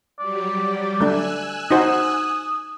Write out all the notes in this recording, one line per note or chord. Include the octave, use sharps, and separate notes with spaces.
F#3 G3 G4 D5
A3 D4 G#5 E6 F#6
D#4 F#4 C5 D#6